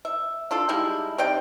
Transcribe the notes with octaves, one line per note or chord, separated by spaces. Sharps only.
E5
D4 F4 A4
G3 G#3 D#4 E4
C3 D#4 D5 G5